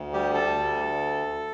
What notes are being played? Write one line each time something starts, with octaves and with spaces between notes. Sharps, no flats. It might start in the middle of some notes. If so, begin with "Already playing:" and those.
Already playing: D2
G3 G4
A4
D2